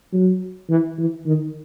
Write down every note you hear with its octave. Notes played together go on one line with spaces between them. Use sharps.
F#3
E3
E3
D#3